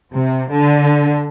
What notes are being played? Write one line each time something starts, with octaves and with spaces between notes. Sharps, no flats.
C3
D3